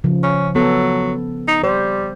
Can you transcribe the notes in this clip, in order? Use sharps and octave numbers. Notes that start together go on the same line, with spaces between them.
C#3 F3
C#4
F#3 B3 A4
D#4
G3 C5